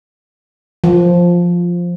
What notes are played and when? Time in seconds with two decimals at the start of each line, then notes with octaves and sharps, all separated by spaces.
0.84 F3